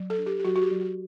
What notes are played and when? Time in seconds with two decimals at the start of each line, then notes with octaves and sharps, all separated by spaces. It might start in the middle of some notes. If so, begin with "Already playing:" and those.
Already playing: F#3
0.10 A4
0.18 D4
0.26 G4
0.39 G4
0.45 F#3 F#4
0.56 F#4
0.62 G4
0.71 F#3
0.80 F#4